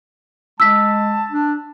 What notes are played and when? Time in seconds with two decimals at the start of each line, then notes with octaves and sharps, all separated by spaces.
0.60 G#3 A5 E6 B6
1.30 D4